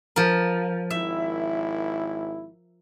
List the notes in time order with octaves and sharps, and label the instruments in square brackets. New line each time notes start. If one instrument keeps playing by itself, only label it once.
[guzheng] F3 A#4
[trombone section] G#1 E4 [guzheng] E5